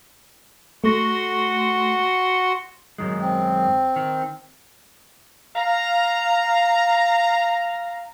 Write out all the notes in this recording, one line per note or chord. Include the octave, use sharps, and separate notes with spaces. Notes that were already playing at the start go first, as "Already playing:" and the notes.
A3 F#4 F#5 C6 C#6 A#6
F#2 D#3 G#3
C4
D#3
F5 A#5